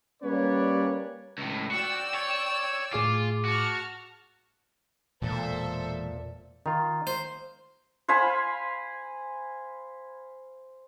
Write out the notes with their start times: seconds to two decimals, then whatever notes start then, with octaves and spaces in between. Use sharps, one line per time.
0.23 G3 A#3 C#4 B4 C#5 D5
1.38 C#2 A2
1.71 F#4 D5 G5 E6
2.14 C#5
2.93 A2 F4 G#4 D6
3.45 F#4 A5 C#6 F6
5.22 E1 A#2 A4 C5 E5
6.66 D#3 F4 A#5
7.07 C5
8.08 C5 F5 G#5 B5